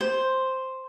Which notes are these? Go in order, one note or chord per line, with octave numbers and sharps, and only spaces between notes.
C5